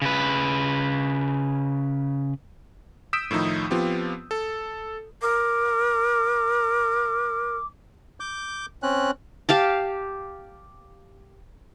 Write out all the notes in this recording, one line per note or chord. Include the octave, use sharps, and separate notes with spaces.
C#3 B4
D#6 E6 G6 B6 D7 E7
A2 D#3 F3 D#4 E4
F3 B3 C4 F4 G4
A4
A#4 D6
D6 G6
C4 C#4 F#6
G4 F5 A5